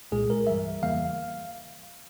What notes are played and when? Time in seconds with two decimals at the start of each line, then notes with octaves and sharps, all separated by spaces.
0.12 C2 A#2 G#3 G#4
0.30 A#4
0.47 G2 E3 G3 E5
0.82 E2 C#3 E3 G3 A#3 F5